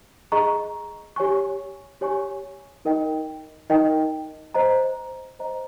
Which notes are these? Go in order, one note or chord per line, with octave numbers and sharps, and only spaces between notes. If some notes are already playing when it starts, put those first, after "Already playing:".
G#4 D#5 A#5 C#6
G4 C#5 G#5 C#6
G4 C#5 G#5 C#6
D#4 A#4 D#5 G5
D#4 A#4 D#5 G5
C5 D#5 A#5
C5 D#5 A#5